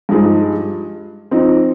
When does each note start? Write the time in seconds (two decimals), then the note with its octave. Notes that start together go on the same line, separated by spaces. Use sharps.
0.09 G2 F3 G#3 D#4 G#4
1.31 F3 C4 D#4